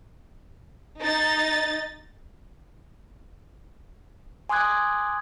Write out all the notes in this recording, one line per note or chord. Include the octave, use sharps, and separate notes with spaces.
D#4 A6
G#5 C6 D6 D#6 F#6 G#6